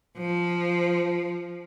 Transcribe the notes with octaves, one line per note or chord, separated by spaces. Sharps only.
F3